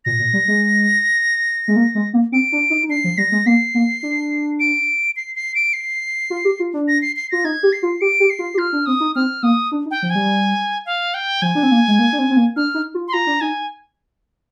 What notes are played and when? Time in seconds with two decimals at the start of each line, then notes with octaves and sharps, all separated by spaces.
0.05 A#2 A#6
0.19 A#2
0.33 G3
0.48 G#3
1.68 G#3
1.76 A#3
1.95 G#3
2.14 A#3
2.32 C4 D7
2.52 D4
2.70 D#4
2.83 D#4
2.89 D4 C7
3.04 F3
3.18 G3 A#6
3.32 G#3
3.46 A#3 C7
3.74 A#3
4.03 D4
4.60 D7
5.16 C7
5.36 C7
5.55 D7
5.73 C7
6.30 F4
6.45 G4
6.60 F4
6.74 D4
6.88 A#6
7.02 C7
7.16 C7
7.31 F4 A#6
7.44 D#4 G#6
7.63 G4
7.73 C7
7.83 F4
8.01 G4 D7
8.20 G4
8.30 C7
8.39 F4
8.54 G4
8.58 F4 F6
8.73 D4
8.86 C4 D#6
9.00 D#4
9.16 C4 F6
9.43 A#3 D#6
9.72 D4
9.86 D#4
9.91 G5
10.02 F3
10.10 G#5
10.15 G3
10.86 F5
11.14 G5
11.42 F3 G#5
11.55 D4
11.63 C4
11.71 A#3
11.88 G#3
11.99 A#3
12.13 D4
12.19 C4
12.30 C4
12.37 A#3
12.56 D4 F6
12.74 D#4
12.94 F4
13.08 C6
13.13 F4 A#5
13.27 D4
13.41 D#4 G#5